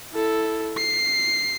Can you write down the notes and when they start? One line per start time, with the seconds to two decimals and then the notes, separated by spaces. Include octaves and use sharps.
0.12 E4 A4
0.77 C7